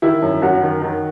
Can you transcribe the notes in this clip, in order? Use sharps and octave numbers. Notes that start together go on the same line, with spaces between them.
D#3 E4
F#2
F#2 F#4
D#3
D#3